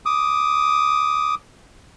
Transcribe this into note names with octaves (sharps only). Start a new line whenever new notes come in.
D6 D#6